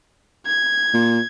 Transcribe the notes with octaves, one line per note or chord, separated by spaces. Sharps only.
G#6
A#2